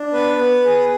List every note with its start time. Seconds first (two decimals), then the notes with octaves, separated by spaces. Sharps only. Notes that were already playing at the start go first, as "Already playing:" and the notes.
Already playing: D4
0.13 B3 B4
0.39 B3
0.65 G#4